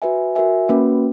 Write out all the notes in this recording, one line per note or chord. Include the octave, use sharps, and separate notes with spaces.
F#4 B4 E5 G#5
F#4 A#4 E5 G#5
A#3 C#4 F#4 B4 F#5